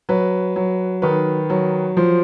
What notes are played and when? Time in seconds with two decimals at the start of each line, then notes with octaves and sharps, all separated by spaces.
0.09 F#3 B4
0.56 F#3
1.02 D#3 B4
1.50 F#3
1.97 F3 C5